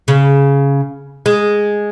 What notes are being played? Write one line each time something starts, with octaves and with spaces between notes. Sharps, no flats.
C#3
G#3